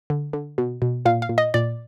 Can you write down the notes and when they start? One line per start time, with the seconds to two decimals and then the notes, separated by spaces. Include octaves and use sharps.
0.10 D3
0.33 D3
0.58 B2
0.82 B2
1.06 A#2 F5
1.22 F5
1.29 A#2
1.38 D#5
1.54 A#2 D5